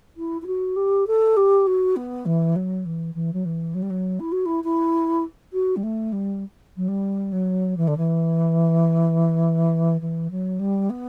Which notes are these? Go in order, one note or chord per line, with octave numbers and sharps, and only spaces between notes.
E4
E4
F#4
G4
A4
G4
F#4
B3
E3
F#3
E3
E3
F#3
E3
F#3
G3
F#3
E4
F#4
E4
E4
F#4
G3
A3
G3
F#3
G3
F#3
E3
D3
E3
E3
F#3
G3
B3